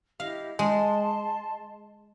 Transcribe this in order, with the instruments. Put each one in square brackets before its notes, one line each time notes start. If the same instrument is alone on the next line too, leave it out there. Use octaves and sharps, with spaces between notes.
[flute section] E4 G4 D#5 [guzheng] F5
[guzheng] G#3 [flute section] A5 C6